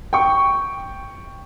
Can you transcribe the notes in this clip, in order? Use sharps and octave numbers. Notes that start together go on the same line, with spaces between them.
G5 C#6